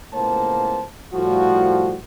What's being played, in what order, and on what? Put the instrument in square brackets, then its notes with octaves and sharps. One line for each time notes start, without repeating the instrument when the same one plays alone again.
[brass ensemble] C#2 A2 A#3 B3 C5 A5
A2 F3 G3 F#4